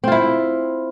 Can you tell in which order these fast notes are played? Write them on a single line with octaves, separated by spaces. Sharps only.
C4 F4 E4